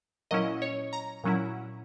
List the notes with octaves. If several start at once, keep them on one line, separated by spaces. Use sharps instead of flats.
A#2 F#3 C#4 E4 D#5
C#5
A#5
A#2 F#3 C#4 E4